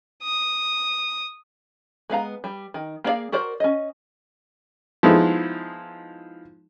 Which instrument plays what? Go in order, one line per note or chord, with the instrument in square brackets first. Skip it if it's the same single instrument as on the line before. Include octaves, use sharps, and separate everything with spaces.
[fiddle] D#6
[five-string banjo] G#3 B3 F5 A#5
G3
D#3
A#3 G#4 C#5 D5 F5
F#4 A#4 C5 D5
C#4 D#5
[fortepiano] F3 G#3 B3 D#4 E4